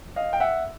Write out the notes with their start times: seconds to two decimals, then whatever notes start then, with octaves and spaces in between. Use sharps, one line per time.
0.16 D#5 F5
0.33 G5
0.40 E5 F#5